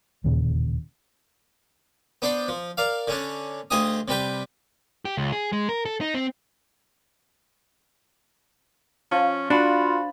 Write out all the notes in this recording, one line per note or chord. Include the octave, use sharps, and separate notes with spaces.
E1 D#2 A#2 C#3
B3 D4 C5 D5
F3
A#4 D5 F5
D3 C#4 D4
D2 F4 G4 G#4 D#5 D#6
C3 G3 B4 G5
G4
C#2
G#4
G#3
A#4
A4
D#4
C4
F3 C#4
D4 F4 F#4 B5